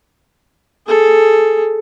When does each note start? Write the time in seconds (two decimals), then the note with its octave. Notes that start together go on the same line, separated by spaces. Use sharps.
0.87 G#4 A4